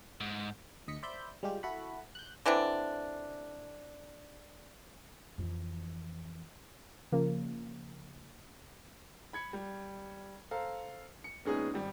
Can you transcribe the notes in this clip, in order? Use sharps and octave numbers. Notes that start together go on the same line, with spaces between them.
G#2
D2 D#5 B6 C#7
C5 D5 E5 B5 G6
G3 G#3 F4 G4
E4 F#4 A4 F#5 B5
F#6 G6
D3 E3 C4 D4
F2 E3
C#3 F3 A#3
B5 G#6 C#7
G3
A4 C5 F5 A#5
C#7
A#1 G#3 B3 C#4 D#4 G#4
G#1 G3